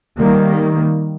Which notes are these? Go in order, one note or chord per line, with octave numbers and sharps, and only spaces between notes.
D#3 G3 A#3